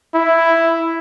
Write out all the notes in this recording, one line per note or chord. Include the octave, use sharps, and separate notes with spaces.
E4